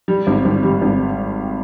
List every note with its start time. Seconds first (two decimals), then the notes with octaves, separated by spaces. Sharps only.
0.08 G3
0.27 G#1
0.45 G#1
0.63 G3
0.82 G#1